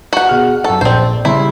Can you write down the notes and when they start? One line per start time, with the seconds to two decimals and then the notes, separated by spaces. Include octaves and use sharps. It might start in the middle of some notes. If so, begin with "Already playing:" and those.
0.13 F#4 F#5
0.29 B2 G#4 F6
0.64 F#2 A4 C#6
0.81 A#1 C4 C5 D5
1.25 C#3 G3 E4 C6